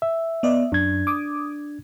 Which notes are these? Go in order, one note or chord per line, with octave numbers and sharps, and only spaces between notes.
E5
B3 D5 D#5
F#2 D4 G#6
D6 D#6